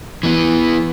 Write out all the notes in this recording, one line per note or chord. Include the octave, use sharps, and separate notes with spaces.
E3 B3